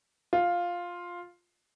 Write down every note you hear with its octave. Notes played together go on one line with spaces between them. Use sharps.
F4